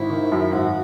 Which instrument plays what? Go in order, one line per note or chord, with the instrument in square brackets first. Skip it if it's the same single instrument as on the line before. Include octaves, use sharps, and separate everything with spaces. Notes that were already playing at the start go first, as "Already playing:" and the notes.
Already playing: [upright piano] G#1 [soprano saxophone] E4
[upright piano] D#3
F#2
[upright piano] G#1 [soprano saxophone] F#4